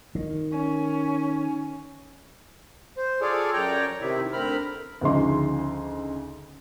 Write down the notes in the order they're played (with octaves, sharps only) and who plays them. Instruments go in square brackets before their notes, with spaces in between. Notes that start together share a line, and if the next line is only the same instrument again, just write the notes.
[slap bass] D#3
[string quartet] C#4
[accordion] C5
F4 G#4 A4 C#5 D5
F#2 C#5 D5 G5 A#5
C3 D#3 E4
D2 C4 A#4 B5 F6
[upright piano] D2 C#3 F3 G#3 D#4 C6